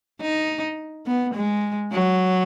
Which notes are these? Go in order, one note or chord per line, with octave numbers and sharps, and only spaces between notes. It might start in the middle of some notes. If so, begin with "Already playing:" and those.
D#4
B3
G#3
F#3